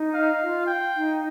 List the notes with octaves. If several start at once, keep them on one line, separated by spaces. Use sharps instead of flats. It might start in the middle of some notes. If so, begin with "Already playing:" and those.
Already playing: D#4
D#5 F5
F4
F5 G5
D#4